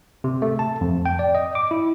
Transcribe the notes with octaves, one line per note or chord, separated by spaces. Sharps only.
C3
A3
A5
F2
G5
D5
D#5
D6
E4